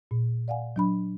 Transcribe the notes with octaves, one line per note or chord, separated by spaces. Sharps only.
A#2
D5 F5 F#5 G#5
F#3 D4 B5